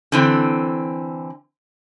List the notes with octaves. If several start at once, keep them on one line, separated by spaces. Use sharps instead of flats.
D3 E3 C4